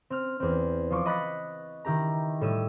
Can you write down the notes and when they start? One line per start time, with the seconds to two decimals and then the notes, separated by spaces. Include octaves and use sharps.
0.10 C4 F6
0.40 E2 C4
0.90 F3 F4 C#6 D6
1.06 D#5 B5 F#6 A6 B6 C#7
1.85 D#3 E4 G4 A#5
2.41 A2 G3 C#5 E6 D#7